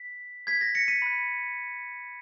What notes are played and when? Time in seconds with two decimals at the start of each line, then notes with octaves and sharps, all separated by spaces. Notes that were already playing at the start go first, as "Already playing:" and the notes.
Already playing: B6
0.47 G#6 B6
0.61 A#6
0.75 A#6 C#7
0.88 B6 D#7
1.02 B5 F#6